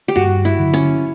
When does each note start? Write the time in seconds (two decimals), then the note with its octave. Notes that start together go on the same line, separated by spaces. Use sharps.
0.08 G4
0.16 G2 F#4
0.45 E4
0.59 D3 F#3
0.73 C#4